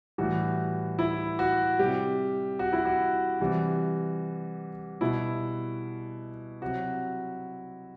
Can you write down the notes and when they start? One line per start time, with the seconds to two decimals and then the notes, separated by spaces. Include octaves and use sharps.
0.18 A2 E3 G3 F#4
0.99 E4
1.39 F#4
1.79 C3 G3 G4
2.59 F#4
2.73 E4
2.85 F#4
3.40 C3 E3 G3
5.01 B2 G3 E4
6.62 C3 F#3 F#4